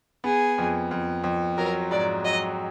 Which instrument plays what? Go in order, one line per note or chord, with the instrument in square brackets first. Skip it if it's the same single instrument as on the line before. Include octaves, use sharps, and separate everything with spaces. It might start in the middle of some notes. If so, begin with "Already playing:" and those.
[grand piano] B3 [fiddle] G#4
[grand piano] F2
F2
F2
[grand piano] F#3 [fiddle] A#4
[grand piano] G#2 [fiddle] D5
[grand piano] F#3 [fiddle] D#5